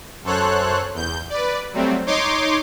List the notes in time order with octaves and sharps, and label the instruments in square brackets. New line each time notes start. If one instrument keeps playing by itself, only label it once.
[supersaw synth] F#2 A4 C5 C#5 F#6
E2 G6
B4 D5
F#3 G3 A3 C4
D#4 C#5 C6 D6